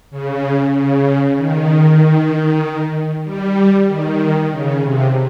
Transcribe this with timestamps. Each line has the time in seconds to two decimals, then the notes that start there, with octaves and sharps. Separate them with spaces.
0.11 C#3
0.74 C#3
1.37 D#3
3.25 G3
3.89 D#3
4.51 C#3
4.82 C3